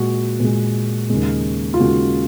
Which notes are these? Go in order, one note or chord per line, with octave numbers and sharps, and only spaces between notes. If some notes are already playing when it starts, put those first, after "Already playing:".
Already playing: A#2 G#3 F#4
A#2 G#3
D#2 C#3 G#3
F4
D#2 C#3 G#3 F#4